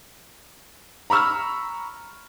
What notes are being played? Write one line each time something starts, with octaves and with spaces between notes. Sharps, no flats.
A#5 B5 C#6 E6 F6